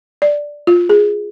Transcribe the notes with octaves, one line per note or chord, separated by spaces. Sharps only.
D5
F4
G#4